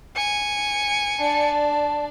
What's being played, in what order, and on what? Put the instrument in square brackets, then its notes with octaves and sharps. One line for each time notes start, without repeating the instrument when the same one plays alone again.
[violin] G#5 C#7
[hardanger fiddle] D4 D5 [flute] A5